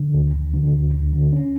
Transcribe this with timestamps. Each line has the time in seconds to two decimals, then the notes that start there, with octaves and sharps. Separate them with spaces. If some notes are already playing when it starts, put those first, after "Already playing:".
Already playing: D3
0.14 D2
0.34 D2
0.54 D3
0.73 D2
0.93 D2
1.13 D3
1.33 C#4